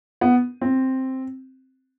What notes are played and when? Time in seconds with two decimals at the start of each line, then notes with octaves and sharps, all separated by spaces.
0.21 B3
0.61 C4